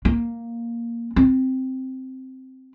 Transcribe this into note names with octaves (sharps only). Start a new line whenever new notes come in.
A#3
C4